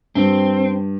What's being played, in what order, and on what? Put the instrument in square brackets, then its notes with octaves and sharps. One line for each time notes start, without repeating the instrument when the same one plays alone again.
[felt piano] G2 [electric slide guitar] C4